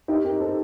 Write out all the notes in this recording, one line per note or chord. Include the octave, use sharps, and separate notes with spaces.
D#4 G4
G4 A#4
A4 C5